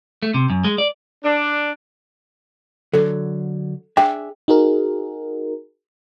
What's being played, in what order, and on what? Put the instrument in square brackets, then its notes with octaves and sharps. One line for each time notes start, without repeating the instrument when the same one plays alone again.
[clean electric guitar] A3
C3
F#2
G#3
D5
[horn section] D4
[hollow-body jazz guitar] D3 F#3 [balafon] A4
[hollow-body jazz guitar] D4 G#4 E5 [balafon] G5
[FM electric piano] D#4 F#4 G#4 A#4